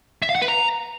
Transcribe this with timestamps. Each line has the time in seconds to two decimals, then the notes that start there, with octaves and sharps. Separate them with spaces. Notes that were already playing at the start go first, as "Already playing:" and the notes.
0.22 E5
0.29 F5
0.35 F#5
0.42 B4
0.48 A#5